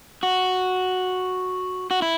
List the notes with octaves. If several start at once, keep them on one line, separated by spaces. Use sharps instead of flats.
F#4
F#4
E4